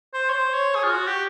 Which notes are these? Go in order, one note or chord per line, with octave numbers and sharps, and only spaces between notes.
C5
C#5
C5
C#5
G#4
F4
F#4
G4